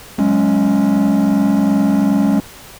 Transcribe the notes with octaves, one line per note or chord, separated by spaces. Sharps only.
F#3 G#3 C#4